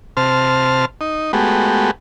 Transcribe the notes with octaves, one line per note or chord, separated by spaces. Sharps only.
C3 C5 A5 F6
D#4
G#3 A3 B3 F#4 G4